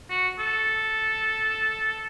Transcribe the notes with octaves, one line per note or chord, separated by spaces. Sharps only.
F#4
A4